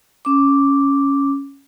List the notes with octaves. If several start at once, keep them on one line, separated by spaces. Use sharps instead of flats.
C#4 D6